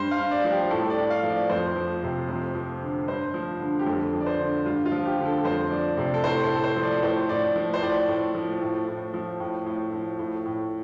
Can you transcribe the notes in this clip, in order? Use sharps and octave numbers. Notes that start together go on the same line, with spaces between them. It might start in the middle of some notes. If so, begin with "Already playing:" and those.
Already playing: G2 C5
F5
G2
D5
F3
G4
A2 A4
D5
A2
F5
F3
D5
F2 C5
F3
C3
F2
F3
D3
G2 C5
F3
D3
G4
F2 A4
F3
D5
C5
D3
G2 F4
F4
F3
G4
D3
A4
F2 C5
F3 D5
C3 D5
A4
A2 C5
A4
A2
C5
F3
D5
A2 C5
A2 D5
F3
C5
A2 D5
A2
F3
A2
A2
F3
A2
A2
F3
A2
A2